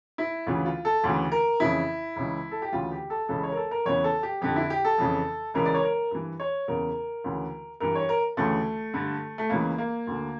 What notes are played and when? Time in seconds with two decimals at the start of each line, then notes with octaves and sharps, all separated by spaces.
0.18 E4
0.47 D2 C#3 E3 F4
0.66 F4
0.85 A4
1.04 D2 C#3 E3
1.32 A#4
1.60 F2 C#3 E3 E4
2.16 C#2 C#3 E3
2.51 A4
2.62 G4
2.73 D2 C#3 E3 F4
2.92 G4
3.10 A4
3.29 C#2 C#3 E3 A4
3.43 C#5
3.52 A#4
3.57 A4
3.71 A#4
3.86 E2 C#3 E3 C#5
4.04 A4
4.23 G4
4.42 F2 D3 G4
4.56 E4
4.70 G4
4.85 A4
4.98 F2 C#3 E3
5.54 C#2 C#3 E3 A#4
5.65 D5
5.74 C#5
5.83 A#4
6.11 G2 E3
6.40 C#5
6.68 E2 C#3 E3 A#4
7.24 D2 C#3 E3
7.80 G2 E3 A#4
7.95 C#5
8.09 A#4
8.37 D2 C#3 E3 A3
8.94 G2 D3
9.38 A3
9.50 C#2 C#3 E3 A#3
9.78 A#3
10.07 D2 D3